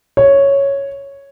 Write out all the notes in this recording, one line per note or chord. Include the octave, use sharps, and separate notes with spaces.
C#5